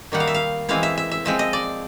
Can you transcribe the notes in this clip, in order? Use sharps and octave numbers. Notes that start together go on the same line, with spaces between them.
D#3 G3 A#3 D#4 F#5
F5
E5
F5
E3 G#3 C4 E4 F5
E5
E5
E5
F3 G#3 C4 E5
D#5
D5